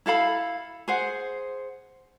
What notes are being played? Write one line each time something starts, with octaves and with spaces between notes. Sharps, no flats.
E4 A4 F5 B5
G#4 C5 F#5